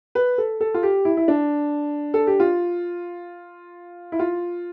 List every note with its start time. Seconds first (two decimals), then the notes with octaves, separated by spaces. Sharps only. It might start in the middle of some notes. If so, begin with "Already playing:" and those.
0.15 B4
0.38 A4
0.60 A4
0.74 F4
0.83 G4
1.05 E4
1.17 E4
1.28 D4
2.14 A4
2.27 G4
2.40 F4
4.12 E4
4.19 F4